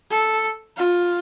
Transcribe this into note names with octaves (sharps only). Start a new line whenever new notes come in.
A4
F4